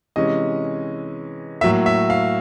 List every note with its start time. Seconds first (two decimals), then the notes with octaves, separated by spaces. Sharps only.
0.16 C3 E3 G#3 C#4 D#5
1.61 A2 F#3 A#3 E5
1.86 E5
2.10 F5